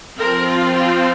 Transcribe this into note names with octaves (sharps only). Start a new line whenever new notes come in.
F3 C4 A#4
F4
F4